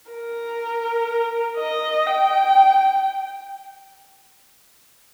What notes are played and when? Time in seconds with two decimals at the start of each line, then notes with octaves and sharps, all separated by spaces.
0.12 A#4
1.58 D#5
2.07 G5